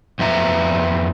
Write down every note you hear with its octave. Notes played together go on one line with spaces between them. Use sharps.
F2 B3 E5 A#5